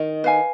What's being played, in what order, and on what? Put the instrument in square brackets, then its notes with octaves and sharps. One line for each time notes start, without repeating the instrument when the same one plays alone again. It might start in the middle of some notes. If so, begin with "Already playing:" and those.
Already playing: [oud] D#3
[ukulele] B4 F5 G#5